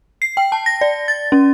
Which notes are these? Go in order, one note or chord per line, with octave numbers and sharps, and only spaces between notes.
C7
G5
A5
A#6
D5
A6
C#4